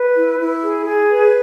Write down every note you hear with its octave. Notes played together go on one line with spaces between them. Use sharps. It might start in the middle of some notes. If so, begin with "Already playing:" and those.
Already playing: B4
E4
E4
G#4
G#4
B4